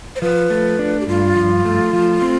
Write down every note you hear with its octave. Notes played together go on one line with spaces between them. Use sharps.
C5
F3 B4
A3
D4
G4
G2 F4
F3
A3
F3
C4